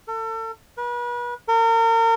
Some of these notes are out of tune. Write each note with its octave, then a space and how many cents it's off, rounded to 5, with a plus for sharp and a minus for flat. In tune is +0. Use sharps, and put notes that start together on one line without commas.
A4 +35
B4 -35
A#4 -35